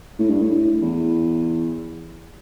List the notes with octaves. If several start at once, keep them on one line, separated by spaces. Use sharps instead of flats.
A2
G2
A2
E2